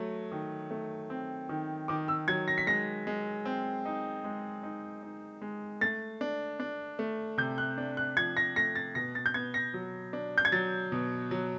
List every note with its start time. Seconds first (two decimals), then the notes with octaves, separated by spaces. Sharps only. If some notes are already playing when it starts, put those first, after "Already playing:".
Already playing: F#3 A3
0.32 D#3
0.71 A3
1.10 C4
1.49 D#3
1.88 D#3 D6
2.08 E6
2.28 F#3 G#6
2.48 A#6
2.58 B6
2.67 G#3 A#6
3.07 G#3
3.45 C4
3.85 D#4
4.24 G#3
4.63 D#4
5.03 D#4
5.42 G#3
5.81 A3 A6
6.21 D4
6.60 D4
6.99 A3
7.38 C3 G6
7.58 F#6
7.78 D4
7.97 F#6
8.17 F3 G#6
8.37 A#6
8.56 A3 A#6
8.75 A6
8.95 B2 A#6
9.15 A6
9.26 G6
9.34 B3 G#6
9.54 A#6
9.74 F#3
10.13 D4
10.38 G6
10.45 G#6
10.52 F#3 A6
10.92 B2
11.31 F#3